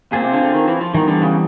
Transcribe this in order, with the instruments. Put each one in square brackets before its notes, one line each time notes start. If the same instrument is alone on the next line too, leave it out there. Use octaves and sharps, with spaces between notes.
[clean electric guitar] A#2 [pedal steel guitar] C4 F4 G#4
[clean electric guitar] C3
D3
D3
D#3
E3
F3
[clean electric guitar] D#3 [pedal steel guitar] E3 G3 B3
[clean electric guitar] D3
C#3